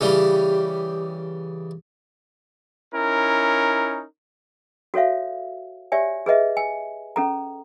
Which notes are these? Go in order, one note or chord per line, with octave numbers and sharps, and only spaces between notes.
C#3 E3 G3 G4
C#4 D#4 E4 A#4
F#4 A4 C#5 E5 F5
G4 C#5 D5 E5 G#5
G#4 B4 D#5 E5
G#5
C#4 A4 A#5